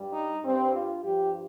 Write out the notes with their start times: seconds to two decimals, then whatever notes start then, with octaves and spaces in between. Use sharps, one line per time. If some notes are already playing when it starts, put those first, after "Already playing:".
Already playing: G2 G3
0.13 D#4
0.43 G2 G3 C4
0.73 F4
1.03 G2 F3 G4